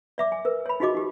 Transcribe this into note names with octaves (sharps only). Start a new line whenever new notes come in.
D5 E5 D6
G#5
A#4 B4
C#5 B5
D#4 F4 F#4 G#4 D#5 D6
D#4 G4